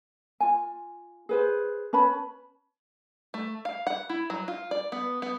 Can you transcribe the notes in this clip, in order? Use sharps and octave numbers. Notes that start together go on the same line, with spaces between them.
F4 G#5
G#4 B4 C5
C#4 B4 A5 B5
A3
F5
F#5
E4
F#3
F4
D5
B3
B3